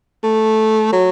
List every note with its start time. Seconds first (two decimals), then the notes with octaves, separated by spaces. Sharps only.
0.24 A3
0.92 F#3